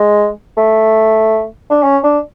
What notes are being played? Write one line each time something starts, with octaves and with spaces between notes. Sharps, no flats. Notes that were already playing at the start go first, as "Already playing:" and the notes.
Already playing: G#3
A3
D4
C#4
D4